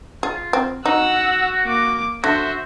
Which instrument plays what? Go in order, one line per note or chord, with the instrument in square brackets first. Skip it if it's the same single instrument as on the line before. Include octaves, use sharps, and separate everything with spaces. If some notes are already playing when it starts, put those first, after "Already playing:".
[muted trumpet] F4 [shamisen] G#4
[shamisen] C4
[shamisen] D#4 [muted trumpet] F#4 [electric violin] F#5 E6
[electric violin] A#3 D6
[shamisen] D3 [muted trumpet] F#4 [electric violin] C5 E5